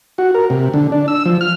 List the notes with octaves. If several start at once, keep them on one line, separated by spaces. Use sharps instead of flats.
F#4
A#4
C3
D3
D4
E6
F3
F6